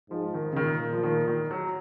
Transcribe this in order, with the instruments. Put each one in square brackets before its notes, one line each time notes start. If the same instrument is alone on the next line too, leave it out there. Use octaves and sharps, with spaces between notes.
[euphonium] G#2 [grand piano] F3
[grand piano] D#3
C#3
[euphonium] A#2 [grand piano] D#3
[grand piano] F3
D#3
D#3
F#3